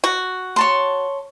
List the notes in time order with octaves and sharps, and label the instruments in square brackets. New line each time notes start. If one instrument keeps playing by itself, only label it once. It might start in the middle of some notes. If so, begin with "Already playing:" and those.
[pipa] F#4
[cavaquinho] C#5 A5 C6